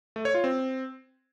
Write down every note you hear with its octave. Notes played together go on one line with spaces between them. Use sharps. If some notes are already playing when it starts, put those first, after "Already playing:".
A3
C#5
F4
C4